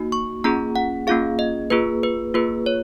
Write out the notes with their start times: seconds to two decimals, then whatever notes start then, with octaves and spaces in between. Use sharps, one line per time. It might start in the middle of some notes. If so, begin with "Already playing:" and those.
Already playing: A#3 D#4 F#4
0.12 C#6
0.44 A#3 C#4 F4 G#4 A#5
0.76 F#5
1.07 A#3 C#4 F4 G#4 F5
1.39 D#5
1.70 A#3 F4 G#4 B4
2.03 B4
2.34 A#3 F4 G#4 B4
2.66 C#5